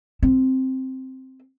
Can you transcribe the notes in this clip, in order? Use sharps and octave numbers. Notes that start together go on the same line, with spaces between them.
C4